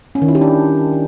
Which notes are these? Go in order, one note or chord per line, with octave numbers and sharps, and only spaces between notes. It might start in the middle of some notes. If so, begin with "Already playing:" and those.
C#4
D#3
E4
G4
D4